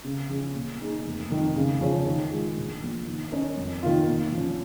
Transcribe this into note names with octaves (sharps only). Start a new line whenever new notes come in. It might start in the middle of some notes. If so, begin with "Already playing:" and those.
C#3
F3 C#4 G#4
A#2
A#3 D#4 G#4
F1
F2 D#3
C#3
F3 C#4 G#4 C#5
D#3
G#3 F4
A#1
A#2 F3
D#3
C#4 A#4 D#5
F2
D#3 A#3 F4
A#2
F3 C#4